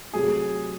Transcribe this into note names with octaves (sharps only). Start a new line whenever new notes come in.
C3 F#3 A3 G#4